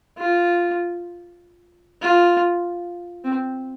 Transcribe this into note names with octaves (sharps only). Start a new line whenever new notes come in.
F4
F4
C4